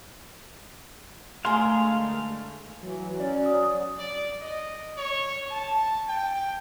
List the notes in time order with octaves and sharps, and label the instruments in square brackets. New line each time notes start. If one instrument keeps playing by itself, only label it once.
[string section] D3 G#3 A3 [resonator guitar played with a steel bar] G#4 A#4 [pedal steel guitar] F5 C6
[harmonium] E3 [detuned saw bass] F#3
[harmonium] C#4 [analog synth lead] D5
[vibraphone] D#6
[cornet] D5
D#5
C#5
A5
G5